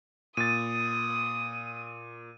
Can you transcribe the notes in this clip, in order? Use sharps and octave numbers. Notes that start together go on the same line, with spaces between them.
A#2 D#6 A6 D#7